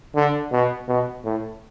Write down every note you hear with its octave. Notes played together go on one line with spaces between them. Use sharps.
D3
B2
B2
A2